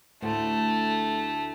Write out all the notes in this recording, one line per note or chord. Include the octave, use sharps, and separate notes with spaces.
D2 A2 A3 C5